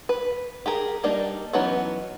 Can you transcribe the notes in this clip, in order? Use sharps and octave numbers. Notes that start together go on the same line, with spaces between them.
B4
G4 G#4 A#4
G3 A#3 D4 D#4
E3 F#3 B3 C#4 D#4